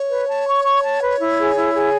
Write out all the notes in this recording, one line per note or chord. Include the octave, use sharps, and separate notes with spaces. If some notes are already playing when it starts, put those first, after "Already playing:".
Already playing: C#5
B4
A5
C#6
C#6
A5
B4
E4
G#4
E4
G#4